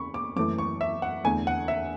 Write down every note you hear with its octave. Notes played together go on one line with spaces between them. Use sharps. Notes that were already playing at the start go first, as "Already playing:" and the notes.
Already playing: E2 C#3 B5 C#6
D6
F#2 E3 A3 D6
C#6
E5
F#5
E2 D3 A3 G#5
F#5
E5